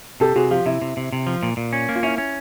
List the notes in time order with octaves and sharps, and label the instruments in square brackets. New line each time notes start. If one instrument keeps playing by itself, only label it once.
[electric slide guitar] C3 [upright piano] G4 A4
[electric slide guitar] C3 [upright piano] F#4 G#4
[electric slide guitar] F3 [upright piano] F4 G4
[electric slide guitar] C3 [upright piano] E4
[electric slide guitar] C3
C3
C3
F3
A#2
A#2
C#4
A#3
[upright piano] F4
[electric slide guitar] C#4 [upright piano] E4
[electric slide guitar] C#4